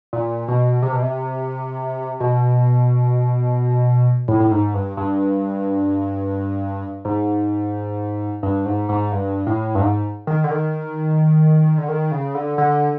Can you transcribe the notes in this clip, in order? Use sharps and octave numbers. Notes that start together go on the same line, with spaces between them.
A#2
B2
C3
B2
C3
B2
A2
A2
G#2
G2
G2
G#2
G2
G#2
G#2
G2
A2
G2
G#2
D#3
D3
D#3
D3
D#3
C#3
D3
D3